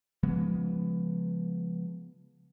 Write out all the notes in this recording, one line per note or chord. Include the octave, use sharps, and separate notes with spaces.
C#3 F3 G#3 B3